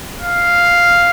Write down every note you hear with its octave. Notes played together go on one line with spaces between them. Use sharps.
F5